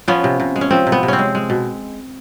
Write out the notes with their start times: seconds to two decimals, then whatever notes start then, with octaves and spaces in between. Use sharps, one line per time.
0.08 F3 B3 C#4
0.24 C3
0.40 C3
0.56 G#3
0.61 C#4
0.71 F3 C4
0.87 C3
0.92 B3
1.03 C3
1.08 C4 C#4
1.19 G#3
1.35 G#3
1.50 B2